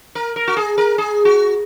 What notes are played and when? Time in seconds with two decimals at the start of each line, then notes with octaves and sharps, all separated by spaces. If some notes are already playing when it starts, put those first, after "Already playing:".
0.15 A#4
0.36 A#4
0.47 F#4
0.57 G#4
0.78 A#4
0.98 G#4
1.25 F#4